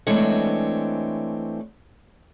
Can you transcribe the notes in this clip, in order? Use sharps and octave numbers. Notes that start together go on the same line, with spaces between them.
E3 G#3 A3 C4 D4 C#5